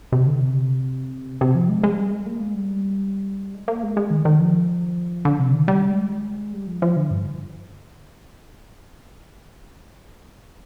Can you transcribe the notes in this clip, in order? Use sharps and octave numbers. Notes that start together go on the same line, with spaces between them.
C3
D3
C3
C3
F3
G#3
G#3
G3
G#3
A#3
G#3
G3
G#3
A#3
G#3
G#3
D#3
D#3
F3
D3
C3
D#3
G3
G#3
G3
F3
F3
D3
G2